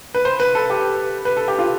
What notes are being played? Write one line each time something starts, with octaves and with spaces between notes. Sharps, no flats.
B4
C5
B4
A4
G4
B4
A4
G4
F4